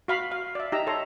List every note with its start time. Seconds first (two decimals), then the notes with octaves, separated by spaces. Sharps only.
0.08 F#4 F5 B5
0.32 F5
0.55 D5 E5
0.72 D#4 G4 E5 A#5 E6
0.87 A4 C#5 A#5 C6